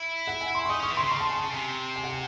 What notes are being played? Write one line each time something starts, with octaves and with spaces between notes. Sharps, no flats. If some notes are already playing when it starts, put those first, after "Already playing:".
Already playing: E4
F#5
G#5
C6
C#6
D#4 D#6
C#4 C#6
E3
C#3 C6
C6
A5
G#5
A5
C3
G#5
F#5
G#5